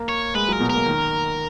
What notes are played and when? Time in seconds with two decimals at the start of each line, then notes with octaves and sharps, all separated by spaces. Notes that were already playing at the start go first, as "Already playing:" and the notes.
Already playing: A#3
0.09 C#5
0.35 G#3 B4
0.48 F#3
0.53 A#4
0.60 B2
0.70 A#3 A#4
0.86 D#3